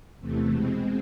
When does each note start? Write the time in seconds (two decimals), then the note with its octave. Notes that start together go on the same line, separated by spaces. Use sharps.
0.20 E2 C3 E3 A3
0.51 B2 G#3 C4